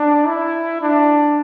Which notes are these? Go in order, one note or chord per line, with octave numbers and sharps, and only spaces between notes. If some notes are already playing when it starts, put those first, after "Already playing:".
Already playing: D4
E4
D4